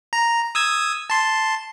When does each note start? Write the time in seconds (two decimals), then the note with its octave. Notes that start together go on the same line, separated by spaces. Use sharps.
0.13 A#5
0.55 D#6 E6 G#6
1.10 A5 C6